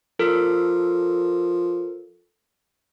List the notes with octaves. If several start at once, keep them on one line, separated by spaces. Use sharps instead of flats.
F3 A4 A#4